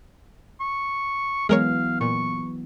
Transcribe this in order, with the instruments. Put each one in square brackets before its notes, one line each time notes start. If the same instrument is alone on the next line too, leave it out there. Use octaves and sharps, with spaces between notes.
[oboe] C#6
[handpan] E3 F#3 B3 [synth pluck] G#3 A#4 C#5 [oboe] F5
[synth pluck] A#2 [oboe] C#6